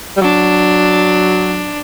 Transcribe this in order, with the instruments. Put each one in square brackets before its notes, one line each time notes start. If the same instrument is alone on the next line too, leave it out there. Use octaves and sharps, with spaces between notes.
[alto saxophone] G3
[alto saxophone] F#3 [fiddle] D4